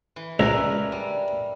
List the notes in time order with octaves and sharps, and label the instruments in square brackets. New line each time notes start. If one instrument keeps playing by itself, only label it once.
[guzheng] E3
[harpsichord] C#2 [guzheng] D4 A#4 B4 [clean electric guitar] E5 G#5 A#5
[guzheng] G3